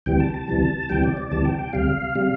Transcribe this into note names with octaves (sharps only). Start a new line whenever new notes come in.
D2 C3 E3 G3 G5
A5
A5
D2 C3 E3 G3
D2 C3 E3 G3 G5
D5
D5
D2 C3 E3 G3 A5
G5
G5
D2 C3 G3 F5
C3 G3